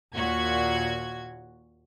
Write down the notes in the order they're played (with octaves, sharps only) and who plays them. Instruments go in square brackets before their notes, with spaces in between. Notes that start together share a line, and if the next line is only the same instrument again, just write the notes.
[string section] D#2 A#2 F#4 G#6